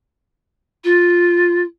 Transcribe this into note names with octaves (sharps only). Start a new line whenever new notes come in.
F4